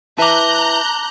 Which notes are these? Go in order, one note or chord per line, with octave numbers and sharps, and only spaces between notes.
E4 B4 E5 A5 A#5 D6 F#6 G6